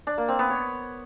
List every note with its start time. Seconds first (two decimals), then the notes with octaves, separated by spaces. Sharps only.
0.07 D4
0.18 A#3
0.28 C4
0.39 B3
0.50 C#5